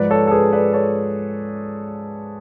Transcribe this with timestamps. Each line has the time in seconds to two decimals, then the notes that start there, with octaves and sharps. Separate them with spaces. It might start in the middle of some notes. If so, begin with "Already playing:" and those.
Already playing: G#2 F3 B4 D5
0.10 A4 C#5
0.27 A4
0.31 G#4 B4
0.53 B4 D5
0.73 A4 C#5